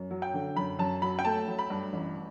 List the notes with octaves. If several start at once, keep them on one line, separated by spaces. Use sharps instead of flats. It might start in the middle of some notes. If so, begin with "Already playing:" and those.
Already playing: F#2
F#3
G5
D3
F#2 B5
F#2 A5
F#3 B5
G5
A3 A5
F#3
B5
G2
A1